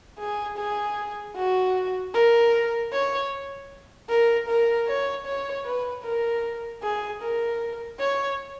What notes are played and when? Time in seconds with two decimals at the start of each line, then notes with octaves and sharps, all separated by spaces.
0.19 G#4
0.58 G#4
1.36 F#4
2.14 A#4
2.93 C#5
4.09 A#4
4.48 A#4
4.87 C#5
5.26 C#5
5.65 B4
6.04 A#4
6.83 G#4
7.21 A#4
7.99 C#5